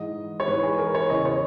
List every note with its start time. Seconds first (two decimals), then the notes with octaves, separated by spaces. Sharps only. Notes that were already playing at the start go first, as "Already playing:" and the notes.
Already playing: G#2 E3 D#5
0.40 C#5
0.48 G#2 E3 B4
0.63 G#4
0.78 A#4
0.95 C#5
1.09 E2 C#3 E3 D#5
1.25 C#5